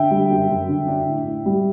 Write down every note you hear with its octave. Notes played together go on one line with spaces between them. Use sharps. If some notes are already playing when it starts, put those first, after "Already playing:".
Already playing: D3 E5 G5
G3
F#2
F#2
D3
D4
A2
A2
G3